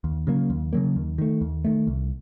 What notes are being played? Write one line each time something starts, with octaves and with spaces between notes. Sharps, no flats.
D#2
C#3 F#3 A#3
D#2
C#3 F#3 A#3
D#2
D#3 A3
D#2
D#3 A3
C2